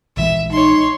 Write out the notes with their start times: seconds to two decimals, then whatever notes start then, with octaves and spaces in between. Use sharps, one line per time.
0.17 A#1 E3 G#3 E5
0.52 D#4 C#5 C6